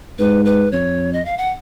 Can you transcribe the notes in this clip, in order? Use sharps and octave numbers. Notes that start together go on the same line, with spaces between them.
G#2 B4
B4
F2 C#5
D#5
F5
F#5